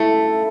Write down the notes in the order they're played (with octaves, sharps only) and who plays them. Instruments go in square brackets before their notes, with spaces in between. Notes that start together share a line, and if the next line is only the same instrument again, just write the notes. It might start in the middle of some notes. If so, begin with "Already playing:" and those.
Already playing: [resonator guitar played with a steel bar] A3 [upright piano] E4